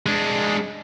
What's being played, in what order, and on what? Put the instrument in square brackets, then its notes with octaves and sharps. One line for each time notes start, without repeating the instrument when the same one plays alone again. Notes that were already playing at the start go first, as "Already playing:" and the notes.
[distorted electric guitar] G#3 D4